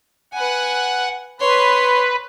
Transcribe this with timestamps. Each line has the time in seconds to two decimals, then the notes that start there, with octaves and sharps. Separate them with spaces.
0.33 B4 F#5 G#5
1.40 B4 C#5 C6